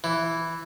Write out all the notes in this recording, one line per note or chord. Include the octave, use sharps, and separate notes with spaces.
E3